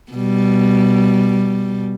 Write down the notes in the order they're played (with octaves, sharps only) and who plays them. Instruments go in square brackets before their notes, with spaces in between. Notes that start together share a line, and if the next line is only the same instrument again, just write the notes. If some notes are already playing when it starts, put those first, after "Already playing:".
[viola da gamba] B2 G3